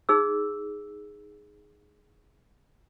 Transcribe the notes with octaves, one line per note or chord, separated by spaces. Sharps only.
D#4 G#4 E6